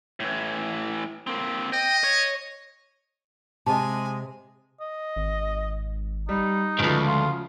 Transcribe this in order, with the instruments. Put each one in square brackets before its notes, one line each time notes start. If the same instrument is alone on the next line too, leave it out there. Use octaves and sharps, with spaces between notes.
[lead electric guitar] A2 E3
A#3 C4
[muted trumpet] D#5 [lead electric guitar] G5
[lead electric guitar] C#5
[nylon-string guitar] C3 [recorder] G#3 [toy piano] D#5 A5 [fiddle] G#5
[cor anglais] D#5
[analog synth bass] G#1
[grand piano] G3 [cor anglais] D#4
[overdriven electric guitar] D2 G2 [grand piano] C#3 F3 B4 [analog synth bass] G#3
[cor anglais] F4